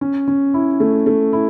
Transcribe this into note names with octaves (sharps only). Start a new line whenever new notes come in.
C#4
C#4
E4
A3
A3
E4